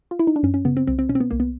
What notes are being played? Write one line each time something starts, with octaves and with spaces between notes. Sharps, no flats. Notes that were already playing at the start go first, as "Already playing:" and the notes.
F4
E4
D#4
D4
F#2 C#4
C#4
C#3 B3
C4
C2 C4
C4
B2 C#4
C4
B3
C2 A#3
B3